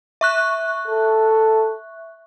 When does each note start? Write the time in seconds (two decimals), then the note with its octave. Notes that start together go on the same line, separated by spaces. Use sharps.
0.21 E5 C#6 F#6
0.88 A4